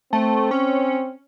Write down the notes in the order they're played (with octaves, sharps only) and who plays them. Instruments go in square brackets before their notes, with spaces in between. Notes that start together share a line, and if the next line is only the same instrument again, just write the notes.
[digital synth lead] A3 [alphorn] C4
[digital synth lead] C#4